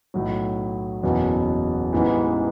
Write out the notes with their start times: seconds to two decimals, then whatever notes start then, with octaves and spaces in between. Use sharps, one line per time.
0.14 B1 A2 F#3
1.03 F#1 E2 B2 F#3
1.93 A1 G#2 E3 B3